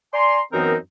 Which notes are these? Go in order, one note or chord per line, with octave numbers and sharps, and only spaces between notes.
D5 G#5 A#5 C6
F#2 E3 B3 C4 D#4 A#4